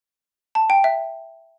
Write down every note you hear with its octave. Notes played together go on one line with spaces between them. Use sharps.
A5
G5
E5